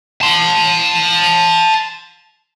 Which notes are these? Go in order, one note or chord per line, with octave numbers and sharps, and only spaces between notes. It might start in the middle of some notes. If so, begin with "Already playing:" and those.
A5 C6